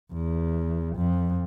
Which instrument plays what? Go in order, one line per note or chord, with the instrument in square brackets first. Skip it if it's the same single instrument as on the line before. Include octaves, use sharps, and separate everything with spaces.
[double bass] E2
F2